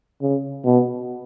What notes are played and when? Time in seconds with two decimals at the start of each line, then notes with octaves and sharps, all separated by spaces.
0.22 C#3
0.65 B2